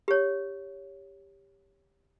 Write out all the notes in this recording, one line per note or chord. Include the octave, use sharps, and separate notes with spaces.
G4 C#5